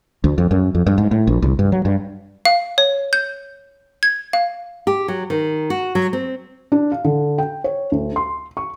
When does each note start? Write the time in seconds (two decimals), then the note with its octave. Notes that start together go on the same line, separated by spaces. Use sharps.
0.24 D2
0.38 F2
0.51 F#2
0.75 F2
0.87 G2
0.98 G#2
1.11 A2
1.27 A#1
1.42 C2
1.59 G2
1.72 F#3
1.85 G2
2.45 F5
2.78 C#5
3.13 G6
4.03 G#6
4.33 F5
4.87 G4
5.08 F#3
5.30 D#3
5.70 F#4
5.95 F#3
6.13 C4
6.72 D4
6.92 F5
7.05 D3
7.38 G5
7.64 C#5
7.92 D2
8.16 C6
8.57 C#6